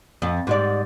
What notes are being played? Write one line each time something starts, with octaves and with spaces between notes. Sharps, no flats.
F2
G#2 G3 D5